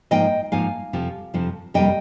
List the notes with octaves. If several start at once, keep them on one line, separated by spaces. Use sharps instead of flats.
G#2 F3 A#3 D#4 D#5 G5
G#2 F3 A#3 D#4 F5 G#5
F2 C3 F3
F2 C3 F3
F2 C3 G3 A#3 D#5 G5